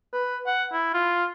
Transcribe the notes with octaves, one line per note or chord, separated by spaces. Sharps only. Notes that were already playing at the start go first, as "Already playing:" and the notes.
B4
F#5
E4
F4